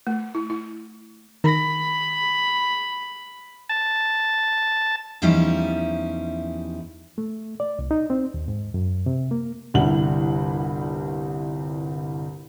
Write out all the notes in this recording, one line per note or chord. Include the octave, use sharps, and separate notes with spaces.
A3
E4
E4
D#3 B5 A#6
A5
E2 F3 G3 C#4 D#4 E4
A3
D5
C2
D#4
C4
D#2
G#2
F#2
C3
A#3
G1 C2 G3 E4 F#5 F#7